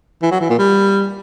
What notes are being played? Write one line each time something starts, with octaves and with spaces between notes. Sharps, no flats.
E3
F#3
E3
A#2
G3